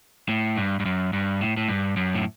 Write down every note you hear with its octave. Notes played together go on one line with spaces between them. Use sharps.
A2
G2
G2
F#2
G2
A2
A2
G2
F#2
A2